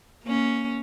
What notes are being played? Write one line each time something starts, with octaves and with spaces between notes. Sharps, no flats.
A#3 C#4